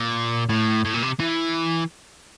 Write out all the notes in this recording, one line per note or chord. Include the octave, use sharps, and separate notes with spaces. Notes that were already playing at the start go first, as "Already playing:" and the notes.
Already playing: A#2
A2
A2
A#2
C3
E3